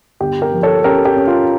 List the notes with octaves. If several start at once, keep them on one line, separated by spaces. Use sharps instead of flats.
G1 G4
G4 A#4
F3
A4 C#5
C#4 G4 A#4
G4
C#4
F4